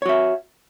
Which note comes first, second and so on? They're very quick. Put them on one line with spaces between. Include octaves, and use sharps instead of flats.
C#5 F#4 E5